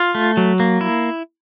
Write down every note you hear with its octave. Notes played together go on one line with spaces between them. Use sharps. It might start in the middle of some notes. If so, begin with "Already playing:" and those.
Already playing: F4
A3
F#3
A#3
E4